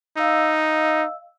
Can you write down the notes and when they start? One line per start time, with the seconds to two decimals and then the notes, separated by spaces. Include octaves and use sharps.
0.17 D#4 D#5 F5 E6